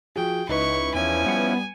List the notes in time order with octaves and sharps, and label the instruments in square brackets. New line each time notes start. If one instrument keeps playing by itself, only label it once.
[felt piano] F3 F#4 G#4 [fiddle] G5
[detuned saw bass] C#2 [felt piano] D#4 B4 [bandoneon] E4 B5 [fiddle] C#6
[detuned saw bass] E2 [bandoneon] F3 C#4 E4 [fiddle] G#5
[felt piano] G3 C#7 [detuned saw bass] B3